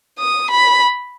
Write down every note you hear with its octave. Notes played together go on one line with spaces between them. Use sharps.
D#6
B5